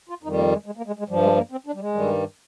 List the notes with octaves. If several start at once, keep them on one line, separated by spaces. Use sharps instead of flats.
F4
F2 D#3 G3 D#4
A#3
G#3
G#3
A#3
G#3
G#3
G2 F3 G3
G#3
A#3
C4
D4
G3
G#3
G2 D#3 G3